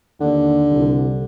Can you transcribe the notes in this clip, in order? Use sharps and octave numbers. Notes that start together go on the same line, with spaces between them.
D#2 D3
C2